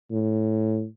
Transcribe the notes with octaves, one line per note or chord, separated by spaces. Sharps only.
A2